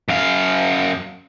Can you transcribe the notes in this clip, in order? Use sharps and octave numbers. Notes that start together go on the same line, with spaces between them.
F#2 F5